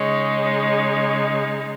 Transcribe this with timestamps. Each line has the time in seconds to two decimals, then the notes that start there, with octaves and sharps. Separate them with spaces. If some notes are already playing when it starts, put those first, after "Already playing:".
Already playing: C#3 G#3 D#4 C#5
0.44 C#5